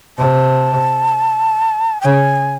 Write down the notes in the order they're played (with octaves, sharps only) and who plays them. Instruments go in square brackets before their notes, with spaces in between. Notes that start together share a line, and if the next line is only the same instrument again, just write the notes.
[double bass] C3 [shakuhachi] A5
[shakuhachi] G5
[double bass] C#3 [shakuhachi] G#5